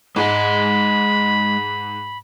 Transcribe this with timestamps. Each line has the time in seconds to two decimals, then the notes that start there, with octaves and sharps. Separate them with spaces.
0.16 G#2 G#3 D#5 B5